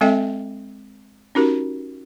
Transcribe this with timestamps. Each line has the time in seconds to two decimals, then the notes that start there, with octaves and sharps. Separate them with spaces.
0.01 G#3 C4 A4 D#5 E5 G5
1.35 C#4 D#4 F#4 G4 A#4